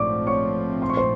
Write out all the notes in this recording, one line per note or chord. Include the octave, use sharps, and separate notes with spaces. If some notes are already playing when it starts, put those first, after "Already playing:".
Already playing: A#1 G#2 F3 A3 C4 D5 C#6 D6
C#5 C#6
C6
C#6
C5 C6